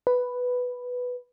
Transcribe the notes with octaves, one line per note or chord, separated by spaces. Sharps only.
B4